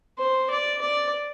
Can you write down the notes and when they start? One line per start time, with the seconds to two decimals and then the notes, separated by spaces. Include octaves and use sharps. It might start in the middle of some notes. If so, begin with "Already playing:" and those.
0.18 C5
0.50 D5
0.81 D5